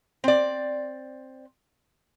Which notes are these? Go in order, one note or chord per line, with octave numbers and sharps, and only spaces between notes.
C4 D5